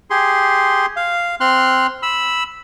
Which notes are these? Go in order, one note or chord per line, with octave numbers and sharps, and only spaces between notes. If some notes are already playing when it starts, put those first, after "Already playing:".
G4 G#4 C6
F5
C4 C6 F6 F#6
B5 E6